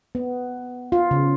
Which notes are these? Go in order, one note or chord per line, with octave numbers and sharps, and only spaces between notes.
B3
F4
C#3